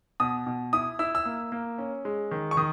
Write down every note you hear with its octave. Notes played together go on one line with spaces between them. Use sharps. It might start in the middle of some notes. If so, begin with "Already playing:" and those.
B2 D#6
B2
E4 D#6
E4 E6
E6
A#3
A#3
C#4
G#3
D#3
C#6
D#3 D#6